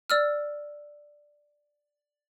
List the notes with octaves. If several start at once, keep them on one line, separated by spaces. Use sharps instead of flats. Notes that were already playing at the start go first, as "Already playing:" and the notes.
D5 E6 F6